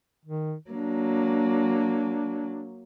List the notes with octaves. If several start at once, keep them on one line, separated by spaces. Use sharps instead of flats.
D#3
F#3 A#3 D4